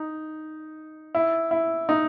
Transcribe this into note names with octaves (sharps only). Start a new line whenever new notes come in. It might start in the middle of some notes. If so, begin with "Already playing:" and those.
Already playing: D#4
E4
E4
D#4